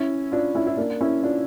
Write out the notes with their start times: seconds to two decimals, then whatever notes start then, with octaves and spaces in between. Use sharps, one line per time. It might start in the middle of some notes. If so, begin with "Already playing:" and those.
Already playing: C#4 E4
0.32 D4 F4
0.55 C#4 E4
0.67 E4
0.77 A#3 D4
1.01 C#4 E4
1.23 D4 F4